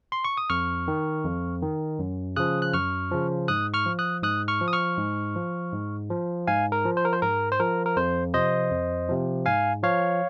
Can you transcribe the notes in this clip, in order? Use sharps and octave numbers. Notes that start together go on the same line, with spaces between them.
C6
C#6
D#6
F2 C#6 F6
D#3
F2
D#3
F#2
C#3 F3 D#6 F#6
F#6
F#2 C#6 F6
C#3 F3
G#2 D#6 F#6
C#6 F6
F3
D#6 F#6
G#2 D#6 F#6
C#6 F6
F3
D#6
C#6 F6
G#2
F3
G#2
F3
G#2 F5 G#5
A#4
F3
C5
A#4
C5
G#2 A#4
C5
F3 A#4
A#4
F2 C5
C3 F3 C5 D#5
F2
C3 F3
G#2 F5 G#5
F3 C#5 F5